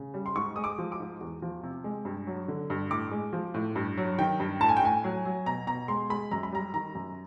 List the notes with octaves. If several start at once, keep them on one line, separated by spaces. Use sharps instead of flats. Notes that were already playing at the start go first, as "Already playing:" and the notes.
Already playing: C#3
G3
C6
G#2 C#6
G#3 D#6
D6
F3
D6
G#2
E2
F3
C3
G#3
G2
F#3
D3
G2
A2 D6
G#3
F3
A2
G2
F#3
D#3 G5
G2
A2 A5
G#5
G5
A2 G#5
F#3
F#3
B2 A#5
B2 A#5
G#3 C6
G#3 B5
F#2 A#5
B5
G3 A#5
D#3 A#5
F#2